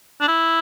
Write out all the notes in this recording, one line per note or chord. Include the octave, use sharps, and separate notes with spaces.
D4
E4